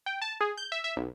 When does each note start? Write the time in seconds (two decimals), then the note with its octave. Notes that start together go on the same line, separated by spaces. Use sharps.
0.06 G5
0.22 A5
0.41 G#4
0.58 G6
0.72 E5
0.84 E5
0.96 B1